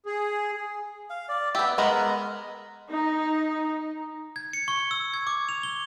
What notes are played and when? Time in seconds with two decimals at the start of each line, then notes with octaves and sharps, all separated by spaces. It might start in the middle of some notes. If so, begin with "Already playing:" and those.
0.06 G#4
1.10 F5
1.29 D5
1.55 B3 G4 E5
1.78 G#3 B3 A#4 D#5
2.90 D#4
4.36 G#6
4.53 C#7
4.68 C#6
4.91 E6
5.13 G#6
5.27 D6
5.49 F7
5.63 G7